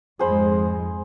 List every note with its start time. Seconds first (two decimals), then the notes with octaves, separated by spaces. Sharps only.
0.19 F2 G#2 G#3 G#4 C5 B5